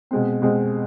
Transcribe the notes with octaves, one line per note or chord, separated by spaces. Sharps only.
B2 G#3 C4
B2 G#3 C4